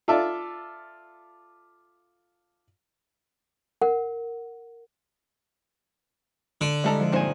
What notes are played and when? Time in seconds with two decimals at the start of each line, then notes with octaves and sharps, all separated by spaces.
0.08 F4 A4 D5 E5 A5
3.82 A#4 F#5
6.61 D3
6.84 G3 G#3 E4 A4 A#5
7.00 F3
7.12 G2 A#2 C4 D#4 C5 G#5